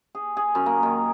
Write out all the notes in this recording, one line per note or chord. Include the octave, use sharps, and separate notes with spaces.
G#4
G#4
F#2
A#3
D#3